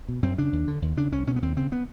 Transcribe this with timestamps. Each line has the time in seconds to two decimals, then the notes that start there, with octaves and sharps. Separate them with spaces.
0.08 B2
0.23 F#2 C4
0.38 C#3 D4
0.53 D#2
0.68 D3
0.82 D#2
0.97 C#3 D4
1.12 C2 C#4
1.27 B2 C#4
1.36 B3
1.42 D#2 C4
1.56 C#3 C4
1.72 B3